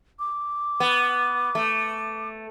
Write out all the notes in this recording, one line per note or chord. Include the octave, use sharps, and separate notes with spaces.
D6
B3
A3